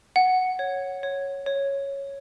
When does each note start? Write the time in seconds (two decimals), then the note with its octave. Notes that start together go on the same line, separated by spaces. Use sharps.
0.16 F#5
0.59 C#5
1.03 C#5
1.46 C#5